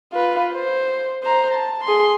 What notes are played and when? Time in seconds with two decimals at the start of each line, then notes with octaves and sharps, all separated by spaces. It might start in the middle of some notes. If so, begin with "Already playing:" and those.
0.13 F4 B4
0.53 C5
1.23 C5 A#5
1.54 A5
1.84 G#4 C6